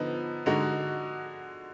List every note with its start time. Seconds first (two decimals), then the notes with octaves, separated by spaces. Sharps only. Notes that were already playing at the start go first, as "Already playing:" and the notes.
Already playing: D3 F3 B3 D#4
0.46 D3 G#3 D#4 F#4